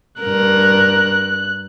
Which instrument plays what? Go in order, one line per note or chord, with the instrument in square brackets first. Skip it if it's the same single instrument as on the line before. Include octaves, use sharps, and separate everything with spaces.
[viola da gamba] G2 A#4 [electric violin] F#6